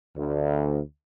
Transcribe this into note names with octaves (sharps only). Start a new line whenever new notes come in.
D2